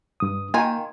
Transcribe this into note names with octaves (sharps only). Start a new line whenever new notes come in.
G2 D#6
D#3 A#3 F4 G5 G#5